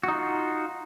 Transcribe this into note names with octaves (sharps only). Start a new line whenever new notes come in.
D#4 F4 F#4